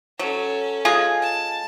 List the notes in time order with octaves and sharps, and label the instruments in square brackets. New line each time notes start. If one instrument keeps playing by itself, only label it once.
[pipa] F#3 [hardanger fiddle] C#4 A4
[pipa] G#3 F4 G#4
[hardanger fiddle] A5